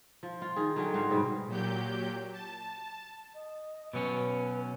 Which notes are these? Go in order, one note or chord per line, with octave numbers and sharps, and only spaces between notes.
F3
F4
D#3 G#4
D3 F#3 C#4 G5
G#2 F#4 C5 F5
G#2 B2 G3
A#2 F#3 G4 G6
A5
D#5
B2 F#3 C#4 B4